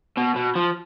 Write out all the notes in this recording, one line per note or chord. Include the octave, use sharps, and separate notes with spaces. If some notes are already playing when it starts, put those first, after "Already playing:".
B2
B2
F3